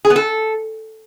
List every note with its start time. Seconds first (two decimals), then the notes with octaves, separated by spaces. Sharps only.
0.05 G#4
0.10 B3
0.16 A4